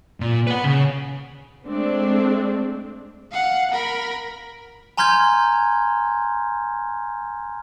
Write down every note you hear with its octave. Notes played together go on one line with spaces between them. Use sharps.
A#2
B4 F#5
C#3
G#3 A3 C4 D4
F5 F#5
A#4 B5
G#5 A#5 C6 F6 G6 G#6